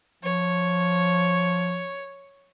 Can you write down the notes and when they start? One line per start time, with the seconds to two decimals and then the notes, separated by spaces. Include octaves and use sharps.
0.23 F3 C#5